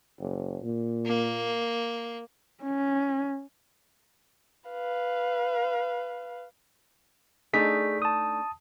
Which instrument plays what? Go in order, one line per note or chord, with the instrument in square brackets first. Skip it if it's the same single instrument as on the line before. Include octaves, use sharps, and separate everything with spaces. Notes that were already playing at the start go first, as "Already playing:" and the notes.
[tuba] F#1
A#2
[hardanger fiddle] A#3
[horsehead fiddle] C#4
[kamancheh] B4 F5
[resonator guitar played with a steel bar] A3 D4 D#4 [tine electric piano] G#4 B6
[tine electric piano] A5 D#6